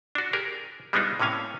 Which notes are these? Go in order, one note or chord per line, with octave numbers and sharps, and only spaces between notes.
D4 F#4
G4 G#4 A#4
G3 G#3 B3 D4 D#4 F4
A2 C3 A#3 C#4 F5 G#5